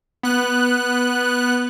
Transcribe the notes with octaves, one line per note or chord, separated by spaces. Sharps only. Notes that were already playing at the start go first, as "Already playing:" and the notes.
B3 F#6